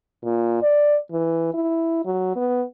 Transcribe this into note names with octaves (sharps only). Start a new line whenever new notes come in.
A#2
D5
E3
E4
F#3
B3